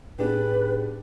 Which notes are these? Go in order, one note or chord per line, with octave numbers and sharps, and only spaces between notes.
A2 B3 D4 D#4 G4 G#4 B4